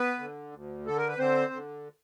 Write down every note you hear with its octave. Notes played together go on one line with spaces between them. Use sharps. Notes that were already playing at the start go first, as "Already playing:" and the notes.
Already playing: B3 B4
D3
D2
D3 A4
A#4
B4
D3 C4 C5
D3